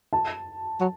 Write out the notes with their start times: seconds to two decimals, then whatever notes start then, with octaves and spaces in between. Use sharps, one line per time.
0.13 A5
0.80 F#3